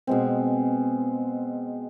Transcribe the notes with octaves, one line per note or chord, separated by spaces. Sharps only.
B2 G#3 C4